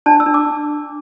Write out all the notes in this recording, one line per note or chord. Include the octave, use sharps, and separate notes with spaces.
D4 A5
E6
D4
D6